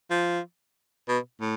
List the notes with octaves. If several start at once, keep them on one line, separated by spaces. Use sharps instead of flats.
F3
B2
A2